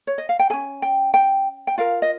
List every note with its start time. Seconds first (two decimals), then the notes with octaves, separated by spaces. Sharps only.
0.07 C#5
0.18 D#5
0.29 F5
0.39 G5
0.50 C#4 G#4 G#5
0.82 G5
1.14 G5
1.67 G5
1.78 F4 A#4 F5
2.02 D#5